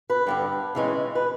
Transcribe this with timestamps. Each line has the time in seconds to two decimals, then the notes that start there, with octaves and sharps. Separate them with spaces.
0.10 B4
0.27 G2 D3 G3
0.75 C#3 E3 G#3 C#4
1.15 B4